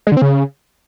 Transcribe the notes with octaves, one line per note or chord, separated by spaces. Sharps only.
G#3
D3
C4
C#3